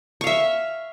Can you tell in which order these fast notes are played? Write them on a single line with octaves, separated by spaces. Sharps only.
C#6 F5 E5